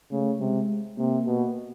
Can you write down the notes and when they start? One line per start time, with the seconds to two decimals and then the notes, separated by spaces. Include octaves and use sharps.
0.12 C#3 A3
0.40 C3 G#3
0.98 C3 A#3
1.26 B2